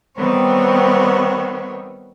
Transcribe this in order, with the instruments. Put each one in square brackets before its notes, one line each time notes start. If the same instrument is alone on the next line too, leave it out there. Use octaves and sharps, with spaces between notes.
[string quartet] D#3 G3 B3 C4 C#5